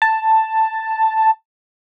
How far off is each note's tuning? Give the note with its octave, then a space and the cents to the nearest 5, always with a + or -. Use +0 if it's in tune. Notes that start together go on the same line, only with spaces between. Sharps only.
A5 +5